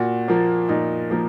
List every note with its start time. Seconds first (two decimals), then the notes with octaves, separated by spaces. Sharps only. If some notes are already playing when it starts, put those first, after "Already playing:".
Already playing: A#2 F#4
0.28 F3 A#3
0.69 A#2 D#4
1.11 F3 A#3